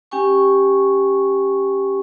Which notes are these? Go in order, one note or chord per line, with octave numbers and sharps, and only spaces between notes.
C#4 G4 G5 G#5 C#6